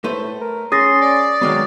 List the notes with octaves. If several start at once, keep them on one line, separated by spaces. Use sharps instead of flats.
A2 A3 B4 C5
A#4
C#4 G#4 C6 D#6 A6 A#6
D5
D#3 F#3 G#3 B3